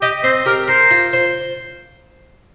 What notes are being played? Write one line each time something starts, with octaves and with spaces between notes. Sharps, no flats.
G4 D#5
C4 C5
G4 A#4
A#4 C5
F4
C5